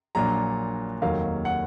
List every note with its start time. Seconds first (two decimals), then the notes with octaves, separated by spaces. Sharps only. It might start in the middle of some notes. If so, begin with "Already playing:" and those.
0.15 A#1 A#2 F#3 D4 A#5
1.02 F1 D#2 D#3 F#3 A#3 F5
1.45 F#5